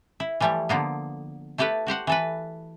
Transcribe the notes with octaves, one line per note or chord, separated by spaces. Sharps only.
E4
E3 F3 G3 A3 C#5
D3 F3 A#3 B3
A3 E4 G4 A4 B4
F#4 G4 C5 F#5
E3 A4 B4